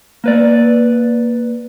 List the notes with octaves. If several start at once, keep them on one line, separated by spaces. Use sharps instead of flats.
A#3 B4 D5